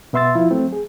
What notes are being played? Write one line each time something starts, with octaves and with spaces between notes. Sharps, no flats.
B2 B3 E5 C6 E6 A6
F3 E4 F4
F#3 A3 C4
G#4